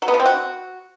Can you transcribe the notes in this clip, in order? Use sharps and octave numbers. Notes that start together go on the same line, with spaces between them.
F#3
B3
F3
C4
F#4